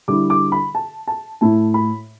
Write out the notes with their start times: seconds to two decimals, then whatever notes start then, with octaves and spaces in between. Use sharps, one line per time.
0.08 D3 G3 E4 D6
0.30 D6
0.52 B5
0.75 A5
1.07 A5
1.41 A2 A3 E4 A5
1.74 B5